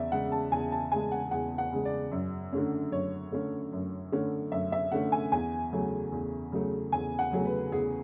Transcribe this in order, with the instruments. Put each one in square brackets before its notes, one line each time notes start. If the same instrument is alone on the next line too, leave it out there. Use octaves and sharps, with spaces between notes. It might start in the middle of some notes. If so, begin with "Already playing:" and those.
Already playing: [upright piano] E2 C#3 D5 E5
C#3 G#3 F#5
A5
E2 G#5
A5
C#3 G#5
G#3
F#5
E2 F#5
F#5
C#3 G#3
D5
F#2
D3 A3 C#4
F#2 C#5
D3 A3 C#4
F#2
D3 A3 C#4
F#2 E5
E5
D3 A3 C#4 F#5
G#5
E2 G#5
C#3 F#3 A3
E2
C#3 F#3 A3
E2 G#5
F#5
C#3 F#3 A3
B4
E2 G#4